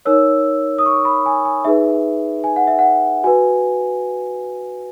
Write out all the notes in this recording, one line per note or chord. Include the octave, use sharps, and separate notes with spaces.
D#4 A#4 C#5 E6
D#6
C#6
B5
G#5
G#5
D#4 G#4 B4 E5
G#5
F#5
E5
F#5
F#4 B4 G#5